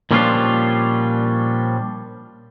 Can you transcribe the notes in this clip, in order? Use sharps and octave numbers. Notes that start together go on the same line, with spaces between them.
A#2 F3 G3 C#4 D4 F4